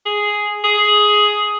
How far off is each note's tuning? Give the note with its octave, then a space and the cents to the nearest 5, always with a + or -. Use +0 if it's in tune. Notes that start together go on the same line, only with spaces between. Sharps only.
G#4 +0
G#4 +10